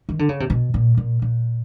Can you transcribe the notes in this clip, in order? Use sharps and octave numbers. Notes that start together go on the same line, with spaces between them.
D#3
D3
C#3
C3
B2
A#2
A#2
A#2